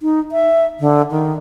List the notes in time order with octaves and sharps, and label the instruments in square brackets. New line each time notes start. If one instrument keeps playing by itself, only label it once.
[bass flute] D#4
E5
D3
D#3